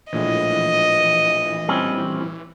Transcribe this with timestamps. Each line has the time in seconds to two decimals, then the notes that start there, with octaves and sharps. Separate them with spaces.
0.13 A#1 A2 E3 G#3 D#5
1.68 G3 C4 C#4